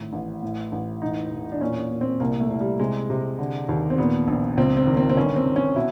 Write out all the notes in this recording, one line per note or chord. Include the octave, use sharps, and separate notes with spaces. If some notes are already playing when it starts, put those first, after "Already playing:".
Already playing: G#1 A2
A1
A2
A1
E1 D#4
E1
D4
A#2 C#4
A#2
C4
C2 A#3
A3
C2
G3
C3 G#3
C3
D3
D#2
C4
A#2 B3
A#1
C#2 C4
C4
D#3
C4
C4
G1 C#4
C4
G1
C#4
B2 E4